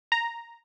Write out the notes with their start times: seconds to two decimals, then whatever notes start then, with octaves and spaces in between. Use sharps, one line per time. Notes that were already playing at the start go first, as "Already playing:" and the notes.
0.12 A#5